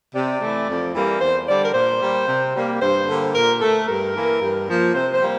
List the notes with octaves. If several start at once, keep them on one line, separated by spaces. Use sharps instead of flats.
C3 D5
E3 A3
F2
E3 G3 A#3
E2 C5
D3 G3 D5
A#4
A#2 C5
G3 A#3
C3
G3 A#3
G2 C5
D3 G3 A#3
A#2 A#4
A3 A4
G2 A#4
E3 A#3
G2
F3 A#3
C3 C5
C5
G3 A#3